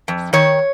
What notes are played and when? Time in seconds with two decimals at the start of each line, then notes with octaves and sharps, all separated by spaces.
0.08 F2
0.33 D#3 C#5